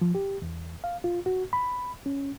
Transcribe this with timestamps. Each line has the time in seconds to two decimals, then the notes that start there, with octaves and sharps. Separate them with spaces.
0.01 F3
0.15 G4
0.42 E2
0.84 F5
1.04 F4
1.26 F#4
1.53 B5
2.06 C#4